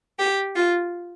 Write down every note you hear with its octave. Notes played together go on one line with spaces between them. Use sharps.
G4
F4